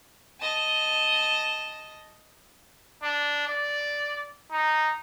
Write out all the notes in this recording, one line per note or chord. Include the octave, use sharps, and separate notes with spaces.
D#5 A5
D4
D5
D#4